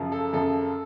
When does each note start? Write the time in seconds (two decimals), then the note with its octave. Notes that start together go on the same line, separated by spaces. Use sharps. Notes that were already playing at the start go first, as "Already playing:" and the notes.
Already playing: F#2 C#3 F3
0.12 A4
0.33 F#2 C#3 F3 A4